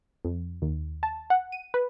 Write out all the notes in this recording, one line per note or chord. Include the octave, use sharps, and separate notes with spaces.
F2
D#2
A5
F#5
D#7
B4